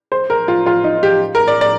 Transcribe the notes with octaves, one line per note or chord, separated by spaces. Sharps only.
C5
A#4
F4
F4
D#4
G4
A#4
D5
D5